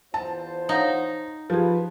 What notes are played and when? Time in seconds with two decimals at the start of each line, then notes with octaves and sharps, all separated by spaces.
0.14 E2 F4 C5 A5
0.69 D#4 C#5 F5 F#5
1.50 F3 G4 G#4 B4